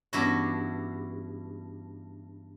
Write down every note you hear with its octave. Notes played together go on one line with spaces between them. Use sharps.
G2 E3 B3 C#4 E4 F#4